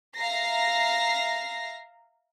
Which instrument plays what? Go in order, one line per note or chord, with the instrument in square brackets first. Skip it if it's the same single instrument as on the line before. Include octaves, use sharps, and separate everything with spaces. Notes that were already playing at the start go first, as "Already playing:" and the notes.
[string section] E5 F5 A#5 A#6 C7